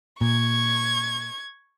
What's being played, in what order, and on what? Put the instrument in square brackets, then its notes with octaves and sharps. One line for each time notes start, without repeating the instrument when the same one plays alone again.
[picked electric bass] A#2 [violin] C#6 G#6